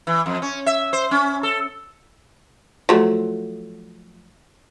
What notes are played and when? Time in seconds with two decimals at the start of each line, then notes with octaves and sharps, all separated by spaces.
0.07 E3
0.26 F2
0.42 C#4
0.66 E5
0.93 C5
1.11 C#4
1.43 A4
2.89 F3 F#3 A3